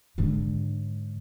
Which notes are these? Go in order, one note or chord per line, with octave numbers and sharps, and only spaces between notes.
G#2 D3